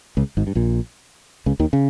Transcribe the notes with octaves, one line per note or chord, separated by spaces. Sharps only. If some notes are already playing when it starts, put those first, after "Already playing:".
C#2 C#3
G#1 G#2
G2
A#1 A#2
C#2 C#3
D#2 D#3
C#3